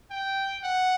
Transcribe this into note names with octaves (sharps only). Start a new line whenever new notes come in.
G5
F#5